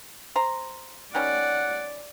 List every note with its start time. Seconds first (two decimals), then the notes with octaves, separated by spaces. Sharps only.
0.36 C5 A#5
1.15 D#3 G3 C#4 D5 F#5